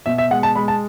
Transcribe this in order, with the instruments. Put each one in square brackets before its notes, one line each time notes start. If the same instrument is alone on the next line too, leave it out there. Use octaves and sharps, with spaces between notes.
[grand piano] B2 E5
E5
G#3 F#5
A5
G#3 B5
A5